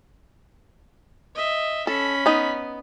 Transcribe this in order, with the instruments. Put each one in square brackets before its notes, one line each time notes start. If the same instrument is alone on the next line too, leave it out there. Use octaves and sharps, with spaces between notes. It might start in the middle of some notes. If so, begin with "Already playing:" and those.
[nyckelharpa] D#5 E5
[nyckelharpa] C#4 B5 [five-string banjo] A4
[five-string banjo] B3 D#4